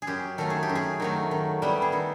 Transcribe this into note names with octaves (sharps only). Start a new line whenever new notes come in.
G#4
F#2 G4
D#3 F#3 A3 A4
G#4
G4
F#2
G#4
D#3 F#3 A3
D#3
G3 B3 E4
G#4
D#3 A4